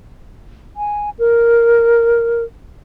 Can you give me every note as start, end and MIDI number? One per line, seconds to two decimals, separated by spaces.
0.77 1.10 80
1.19 2.44 70